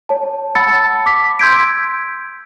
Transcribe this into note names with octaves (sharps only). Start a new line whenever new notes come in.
C#5 A5
F#5 A5 B5 E6 A6 C#7
D6 B6
C6 E6 G6 G#6 B6 D7